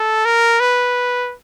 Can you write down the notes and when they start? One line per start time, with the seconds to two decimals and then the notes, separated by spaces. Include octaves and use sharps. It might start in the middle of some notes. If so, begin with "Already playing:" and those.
Already playing: A4
0.25 A#4
0.60 B4